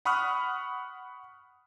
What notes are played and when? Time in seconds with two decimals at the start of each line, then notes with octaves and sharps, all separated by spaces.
0.05 F#5 B5 C#6 D#6 F6 F#6